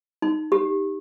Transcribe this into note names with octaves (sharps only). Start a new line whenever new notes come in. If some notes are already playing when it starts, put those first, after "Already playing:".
D#4
G4